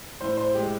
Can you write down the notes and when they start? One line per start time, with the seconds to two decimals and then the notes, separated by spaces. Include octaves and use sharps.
0.21 A2 C5
0.37 C5
0.54 G#3 G4